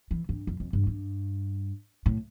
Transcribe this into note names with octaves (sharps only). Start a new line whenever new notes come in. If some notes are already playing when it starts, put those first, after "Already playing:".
E3
G2
F2
F2
G2
G2
A2